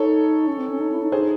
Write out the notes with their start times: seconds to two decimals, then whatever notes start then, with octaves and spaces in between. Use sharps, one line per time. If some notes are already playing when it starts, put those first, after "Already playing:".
Already playing: D#4 A4 C#5
0.48 C#4
0.58 C4
0.69 C#4
0.80 D#4
0.91 E4
1.02 D#4
1.12 D#4 G#4 C5